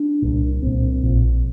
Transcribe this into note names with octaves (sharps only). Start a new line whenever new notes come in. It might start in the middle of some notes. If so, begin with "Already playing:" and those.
Already playing: D4
C2 A#2
C2 A#2 C4
A#1 A#2